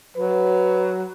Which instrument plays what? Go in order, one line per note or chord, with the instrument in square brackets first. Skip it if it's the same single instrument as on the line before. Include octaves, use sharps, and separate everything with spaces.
[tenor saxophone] F#3 [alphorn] B4